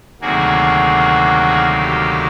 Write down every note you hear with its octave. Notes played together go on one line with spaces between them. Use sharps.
D2 C3 D#3 F#3 A#3 F#4 G#4
G4